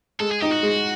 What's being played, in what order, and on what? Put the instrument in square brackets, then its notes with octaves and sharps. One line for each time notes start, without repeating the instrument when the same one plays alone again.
[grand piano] G#3 [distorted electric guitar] A4
[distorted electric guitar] G#4
[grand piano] D#4 [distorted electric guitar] G4
[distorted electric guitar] F#4
[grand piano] G#3